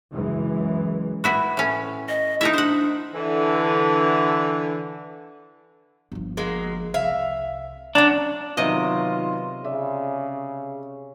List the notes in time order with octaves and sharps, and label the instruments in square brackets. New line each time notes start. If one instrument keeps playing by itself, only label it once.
[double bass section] C#2 F#2 E3 G#3
[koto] B3 E4 F#4
A2 C#4
[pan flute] D#5
[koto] D#4 A#4 E5 [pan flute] E4
[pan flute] D4 [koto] C5 F#5
[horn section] D3 E3
[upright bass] G1 F3
[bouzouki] F#3 G#3 A#3
[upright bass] C2 [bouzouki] E5 F5
[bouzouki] F#3 C#4 [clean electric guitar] D4
[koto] C3 D#5 [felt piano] D#3 F#3 B3 [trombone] F4
[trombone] C#3 [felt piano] D5 E5